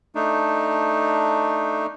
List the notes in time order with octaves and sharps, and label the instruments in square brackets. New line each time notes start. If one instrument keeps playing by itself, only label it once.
[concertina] A3 D4 D#4